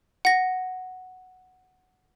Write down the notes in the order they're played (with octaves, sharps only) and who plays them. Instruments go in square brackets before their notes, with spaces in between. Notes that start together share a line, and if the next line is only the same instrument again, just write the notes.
[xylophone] F#5 A#6